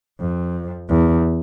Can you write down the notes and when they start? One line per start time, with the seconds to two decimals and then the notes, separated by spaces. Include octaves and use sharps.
0.20 F2
0.89 E2